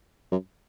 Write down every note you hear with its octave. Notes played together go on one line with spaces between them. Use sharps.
F#2